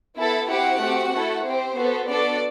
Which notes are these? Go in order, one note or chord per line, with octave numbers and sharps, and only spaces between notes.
B3 E4 A4
C4 E4 F#4 G4 F#5
A3 C4 G4
A3 E4 A4
C4 G4 C5
B3 F#4 A4
B3 D4 F#4 A4 D5